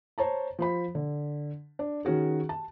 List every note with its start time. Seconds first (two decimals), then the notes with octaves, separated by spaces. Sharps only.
0.18 C5 C#5 A5 A#5
0.59 F3 C5 B5
0.95 D3
1.79 D4
2.05 D#3 C#4 F#4 G#4
2.49 A5